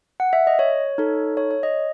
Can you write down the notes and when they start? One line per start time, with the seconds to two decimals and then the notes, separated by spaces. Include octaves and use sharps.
0.20 F#5
0.33 E5
0.47 D#5
0.59 C#5
0.98 D#4 A4
1.37 C#5
1.51 C#5
1.63 D#5